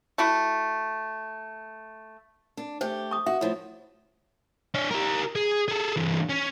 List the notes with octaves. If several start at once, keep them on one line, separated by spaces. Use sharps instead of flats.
A3 E4 F#4
D4
A3 G4 C5
C#6 D#6
F#4 E5
A2 F3
D4 C#5
G4 A#4
G#4
G#4 A4
G2 E3
C#4